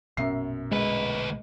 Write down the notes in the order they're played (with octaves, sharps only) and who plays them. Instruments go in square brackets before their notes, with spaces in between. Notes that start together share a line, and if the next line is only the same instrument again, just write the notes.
[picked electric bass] A#1 B2 B3 [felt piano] F#2 E5 C7
[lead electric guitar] D2 B4 [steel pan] G#3